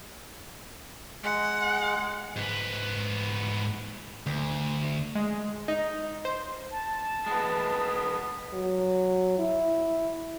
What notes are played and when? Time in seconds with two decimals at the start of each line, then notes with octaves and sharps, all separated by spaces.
1.24 G#3 F#5
2.36 G#2 B3
4.26 D2
5.15 G#3
5.68 D#4
6.25 C5
6.71 A5
7.26 G#3 B3
8.53 F#3
9.38 E4